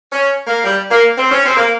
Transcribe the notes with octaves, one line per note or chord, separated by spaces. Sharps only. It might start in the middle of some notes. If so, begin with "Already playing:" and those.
C#4
A#3
G3
A#3
C4
C#4
C4
A#3